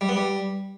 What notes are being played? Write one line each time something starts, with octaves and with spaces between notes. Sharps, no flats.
G3
B3
G3